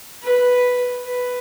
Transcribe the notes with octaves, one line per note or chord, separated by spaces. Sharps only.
B4
B4